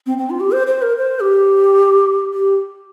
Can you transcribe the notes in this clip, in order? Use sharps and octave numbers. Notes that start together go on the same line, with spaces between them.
C4
C4
F4
G4
C5
C5
A#4
C5
G4
G4